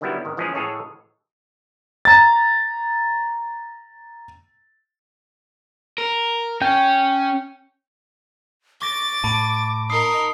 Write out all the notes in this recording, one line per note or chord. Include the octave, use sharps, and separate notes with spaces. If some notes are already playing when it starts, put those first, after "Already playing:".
D3 D#3 F#3 G3 B3 E4
G#1 D#3
E3 F3 G#3 A#3 C#4 G#4
A2 G#3 G#4 A4 C#5 F5
A#5 A6
A#4
C#4 G5
C#6 D6 A6 A#6
A2 A5 B5 D7
D#4 A#4 D#6 C7